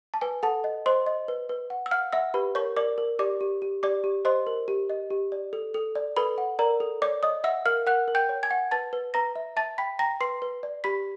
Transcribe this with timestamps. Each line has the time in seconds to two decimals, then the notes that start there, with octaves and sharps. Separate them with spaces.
0.14 A5
0.21 B4 G#5
0.43 A4 F#5 A5
0.64 D#5
0.86 C5 D#5 C6
1.06 D#5
1.28 B4
1.49 B4
1.70 F#5
1.86 E6
1.91 F5 F#5 F6
2.12 E5 F#5 E6
2.34 G4 B4 B5
2.55 A#4 C#5 C#6
2.76 A#4 D5 D6
2.98 A#4
3.19 G4 D5 D6
3.41 G4
3.62 G4
3.83 G4 D5 D6
4.04 G4
4.25 C5 D#5 C6
4.47 A#4
4.68 G4
4.90 D#5
5.10 G4
5.32 D5
5.53 A4
5.74 A4
5.95 D5
6.17 A4 B4 B5
6.38 F#5
6.59 A#4 D5 A#5
6.80 A4
7.02 C#5 D5 D6
7.23 C#5 D#5 D#6
7.44 E5 F#5 E6
7.65 A#4 F5 F6
7.86 A#4 F#5 F#6
8.08 A#4
8.15 G5 G6
8.29 C#5
8.43 G#5 G#6
8.51 F#5
8.71 B4 A5 A6
8.93 B4
9.14 B4 A#5 A#6
9.36 E5
9.56 E5 A5 A6
9.78 G5 B5 B6
9.99 G5 A#5 A#6
10.21 B4 C6 C7
10.42 B4
10.63 D5
10.84 G4 B5 B6